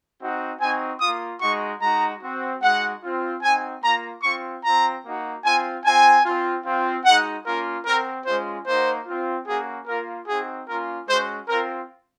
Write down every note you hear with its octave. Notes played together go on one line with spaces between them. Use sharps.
C4 D#4 F#4
C4 D#4 F#4 G#5
A#3 F4 D#6
G#3 D#4 F#4 C#6
G#3 D#4 F#4 A#5
C4 F#4
G#3 D#4 F#4 F#5
C4 F4
C4 D#4 F#4 G#5
A#3 F4 A#5
C4 F4 C#6
C4 F4 A#5
A#3 D#4 F#4
C4 F4 G#5
C4 F4 G#5
C4 F4
C4 F4
G#3 D#4 F#4 F#5
A#3 C#4 F4 A#4
C4 F#4 A#4
G#3 C#4 F4 C5
A#3 D#4 F#4 C5
C4 F4
A#3 C#4 F#4 G#4
A#3 F4 A#4
C4 D#4 F#4 G#4
A#3 C#4 F4 A#4
G#3 C#4 F#4 C5
C4 F4 A#4